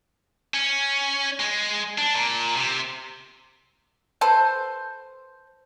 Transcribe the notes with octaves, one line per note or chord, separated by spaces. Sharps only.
C#4
G#3
D4
A#2
C3
A4 B4 C5